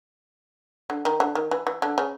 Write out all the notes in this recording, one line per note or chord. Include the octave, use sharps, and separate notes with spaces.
D3
D#3
D3
D#3
E3
E3
D3
C#3